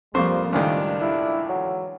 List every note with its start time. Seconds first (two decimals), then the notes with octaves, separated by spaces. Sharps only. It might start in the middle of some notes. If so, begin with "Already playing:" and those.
0.14 F2 F3 G3 A#3 C5 C#6
0.53 C#2 A2 D#3 D4 F4
1.01 G2 A3 E4 F4
1.49 G#2 D3 E3 F#3